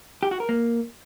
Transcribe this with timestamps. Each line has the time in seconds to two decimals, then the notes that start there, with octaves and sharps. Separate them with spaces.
0.23 G4
0.31 F#4
0.40 A#4
0.49 A#3